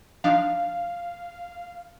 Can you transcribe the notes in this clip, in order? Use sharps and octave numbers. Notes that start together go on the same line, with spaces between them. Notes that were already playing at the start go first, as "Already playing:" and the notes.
F3 D4 D#4 F5